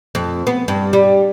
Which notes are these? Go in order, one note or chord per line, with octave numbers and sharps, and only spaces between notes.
F2
B3
G2
G3